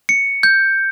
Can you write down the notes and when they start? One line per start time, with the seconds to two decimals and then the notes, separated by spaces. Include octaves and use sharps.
0.09 C#7
0.43 G6